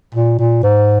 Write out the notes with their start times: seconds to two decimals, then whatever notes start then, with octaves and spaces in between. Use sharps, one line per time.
0.15 A#2
0.39 A#2
0.63 G#2